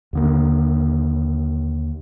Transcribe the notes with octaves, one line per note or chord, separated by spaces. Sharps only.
D#2 D3 A#3